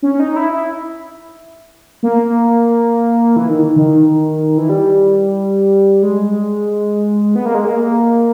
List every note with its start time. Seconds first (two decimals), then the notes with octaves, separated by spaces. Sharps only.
0.03 C#4
0.20 D#4
0.36 E4
0.52 E4
2.03 A#3
3.36 E3
3.49 D#3
3.76 D#3
4.58 E3
4.69 G3
6.03 G#3
7.35 B3
7.46 A#3
7.55 G#3
7.65 A#3